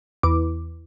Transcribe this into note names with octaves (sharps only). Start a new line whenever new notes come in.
E2 D6